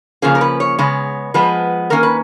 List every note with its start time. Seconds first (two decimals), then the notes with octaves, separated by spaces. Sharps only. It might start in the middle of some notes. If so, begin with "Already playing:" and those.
0.22 C#3 F3 A#3 C#4 G#4
0.35 A#4
0.41 B4
0.60 C#5
0.79 C#3 G#3 B3 C#5
1.34 F3 G#3 B3 B4
1.90 D#3 A#3 C#4 A#4
2.03 B4